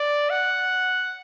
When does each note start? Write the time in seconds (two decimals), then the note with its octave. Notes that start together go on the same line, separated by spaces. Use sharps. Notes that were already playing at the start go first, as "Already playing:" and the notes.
Already playing: D5
0.30 F#5